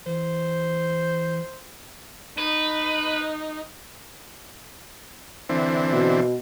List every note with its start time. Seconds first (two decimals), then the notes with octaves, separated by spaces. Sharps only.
0.06 E3 C5
2.38 D#4 B4
5.49 D3 E3 C4
5.92 B2